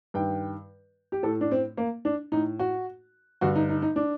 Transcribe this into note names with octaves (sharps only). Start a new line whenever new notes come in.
G2 D#3 G5
G4
A2 A4
D4
C4
A#3
D4
A2 D#4
F#4
G2 D3 F#4
D#4
D#4
D#4
D4